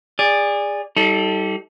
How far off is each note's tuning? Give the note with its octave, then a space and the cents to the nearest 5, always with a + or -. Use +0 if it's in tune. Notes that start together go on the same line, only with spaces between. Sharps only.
G#4 -25 D5 +0
G3 -20 D#4 +45 A4 +0